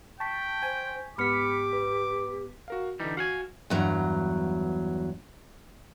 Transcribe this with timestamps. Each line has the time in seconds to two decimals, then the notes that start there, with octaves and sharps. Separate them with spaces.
0.20 G5 A5 C#6 B6
0.63 C5 G#5
1.18 G#2 B3 G4 B5 D6 F6 B6 C#7
1.73 B4
2.68 F#4 A#4 F5
3.00 D3 E3 G3 D#4
3.17 F#4 F5 F#5 G#5
3.70 E2 G2 F#3 A#5